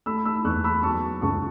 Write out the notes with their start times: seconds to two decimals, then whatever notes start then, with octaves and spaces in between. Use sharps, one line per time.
0.06 A3 B5 E6
0.25 B5 E6
0.44 E2 C#6 F#6
0.64 B5 E6
0.83 F#3 A5 C#6
1.21 C#2 A5 C#6